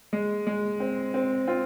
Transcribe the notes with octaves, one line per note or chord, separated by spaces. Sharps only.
G#3
G#3
C4
C4
C4 F4